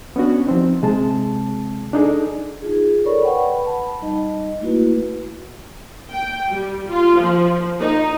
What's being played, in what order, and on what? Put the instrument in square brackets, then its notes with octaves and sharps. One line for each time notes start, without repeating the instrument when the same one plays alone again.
[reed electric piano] B3 C#4 D4 F#4
F3 C4 D#4
C3 G#3 C4 G#4 A5
D4 D#4 G#4 A4
[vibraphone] D#4 F4 G#4
A4 A#4 C#5 D5 B5 C#6
B4 F#5 G5 B5
A5 B5
G3 D#4 D#5
A3 A#3 E4 F#4 B4
[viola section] G5
G3
F4
F3
D#4